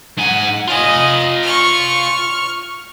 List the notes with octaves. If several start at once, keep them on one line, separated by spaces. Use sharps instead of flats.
G#2 F#5 G#5
F4 D#5 G#5
C#6 F6